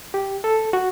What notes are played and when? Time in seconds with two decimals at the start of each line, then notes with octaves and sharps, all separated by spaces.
0.14 G4
0.44 A4
0.73 F#4